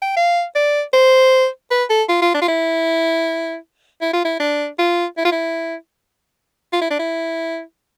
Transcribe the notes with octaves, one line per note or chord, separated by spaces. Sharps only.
G5
F5
D5
C5
B4
A4
F4
F4
D4
F4
E4
E4
F4
E4
D4
F4
E4
F4
E4
F4
E4
D4
E4